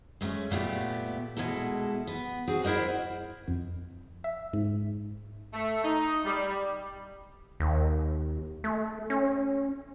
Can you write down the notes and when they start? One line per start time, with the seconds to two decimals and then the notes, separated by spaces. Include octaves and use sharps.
0.21 G#3 A3 B3 C#4
0.51 A#2 A3 B3 G4
1.37 B2 G#3 E4 A4
2.07 B3
2.48 C4 F#4 G#4
2.63 E4 A#4 C5 D#5 F#5
3.48 F2
4.24 E5
4.53 G#2
5.53 A3
5.84 D#4
6.25 G3
7.60 D#2
8.64 A3
9.10 C#4